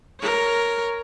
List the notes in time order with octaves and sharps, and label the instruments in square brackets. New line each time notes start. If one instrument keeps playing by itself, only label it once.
[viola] A#4 C#5